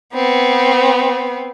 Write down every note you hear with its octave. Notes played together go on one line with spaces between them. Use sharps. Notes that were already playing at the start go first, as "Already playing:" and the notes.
B3 C4